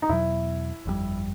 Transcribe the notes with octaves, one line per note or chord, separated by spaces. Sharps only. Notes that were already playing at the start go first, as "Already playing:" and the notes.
D#4
E2 B2 F#3 E4
G1 F2 D3 G3